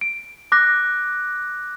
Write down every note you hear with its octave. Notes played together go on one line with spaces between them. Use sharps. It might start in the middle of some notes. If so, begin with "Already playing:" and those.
D7
D6 F#6 A#6